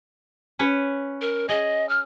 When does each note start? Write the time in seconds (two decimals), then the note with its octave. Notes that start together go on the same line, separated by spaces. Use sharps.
0.59 C#4 B4 C#5
1.21 A#4
1.49 G#4 D#5
1.89 F6